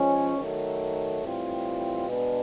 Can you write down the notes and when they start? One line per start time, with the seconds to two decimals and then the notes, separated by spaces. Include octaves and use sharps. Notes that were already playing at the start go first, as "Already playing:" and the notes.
Already playing: F3 G#3 C#4
0.37 D#3 F#3 A3
1.21 A2 E3 G3 C4 F4
2.06 B2 G#3 B3 D4